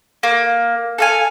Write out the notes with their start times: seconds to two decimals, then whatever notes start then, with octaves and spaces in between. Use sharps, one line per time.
0.23 A#3
0.98 A4 F5 G#5